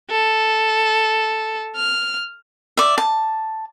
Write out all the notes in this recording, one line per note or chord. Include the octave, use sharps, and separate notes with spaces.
A4
F6
D5 E5
A5